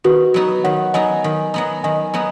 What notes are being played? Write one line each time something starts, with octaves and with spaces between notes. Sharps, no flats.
D#3 F#4 B4
F#3 B3 D#4
D#3 C#5 F#5
F#3 B3 D#4 D#5 G#5
D#3
F#3 B3 D#4
D#3 D#5 G#5
F#3 B3 D#4